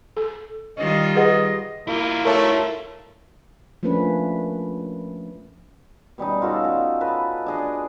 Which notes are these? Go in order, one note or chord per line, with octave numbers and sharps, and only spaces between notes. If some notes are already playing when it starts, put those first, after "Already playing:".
A4
D#3 G3 F4 D#5
G#4 B4 D#5 F#5
A#3 E4 F4
A3 A#4 C#5 A5
F3 A3 A#3 C#4 D4 B4
B2 G3 C#4 D#4
F4 F#4 A4 D#5
C#4
A4 B4 D#5
D4 G#4 D#5